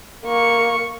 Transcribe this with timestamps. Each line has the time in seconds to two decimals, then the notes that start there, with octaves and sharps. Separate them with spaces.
0.24 A#3 C#6